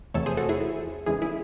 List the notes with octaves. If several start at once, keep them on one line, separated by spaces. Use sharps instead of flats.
E2 C3 E3 A3 A4 C#5
G#4 C5
F#4 A4
E4 G#4
E2 C#3 E3 G#3 E4 G#4
E4 G#4